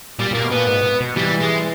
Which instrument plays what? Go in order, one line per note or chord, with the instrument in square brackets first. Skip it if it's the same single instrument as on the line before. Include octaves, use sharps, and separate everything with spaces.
[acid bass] A#2 [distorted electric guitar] G3
[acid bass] A#2 [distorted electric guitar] A#3
[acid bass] B2
[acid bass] A#2 [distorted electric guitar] B3
[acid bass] G#2
B2
[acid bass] E3 [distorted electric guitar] G3
[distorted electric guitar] G#3